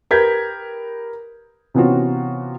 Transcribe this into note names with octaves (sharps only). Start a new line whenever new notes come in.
G4 A#4 B4 G6 G#6 B6
C3 E3 B3 C#4 F4 F#4